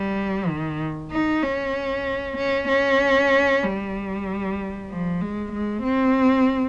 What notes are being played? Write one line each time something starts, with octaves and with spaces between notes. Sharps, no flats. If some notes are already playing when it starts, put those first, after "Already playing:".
Already playing: G3
D#3
D#4
C#4
C#4
C#4
G3
F3
G#3
G#3
C4